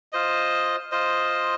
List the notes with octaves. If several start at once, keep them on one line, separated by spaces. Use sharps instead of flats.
F4 C5 D#5
F4 C5 D#5